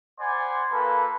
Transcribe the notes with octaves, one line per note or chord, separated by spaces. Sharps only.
C5 D5 F#5 G#5 B5 C6
A#3 F4 A4 B4